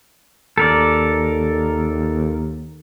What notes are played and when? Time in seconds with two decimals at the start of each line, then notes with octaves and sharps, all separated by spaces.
0.58 D#2 A4 A#4 D5